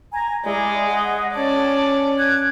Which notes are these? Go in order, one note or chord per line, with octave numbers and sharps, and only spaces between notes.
G#5 A#5
G#3 E4 D5 E5
G#4 D#5 F#5
C#4 C#5 D5 A5
F#6 G#6